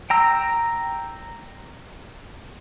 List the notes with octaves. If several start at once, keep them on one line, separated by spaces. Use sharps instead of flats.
G5 A#5 E6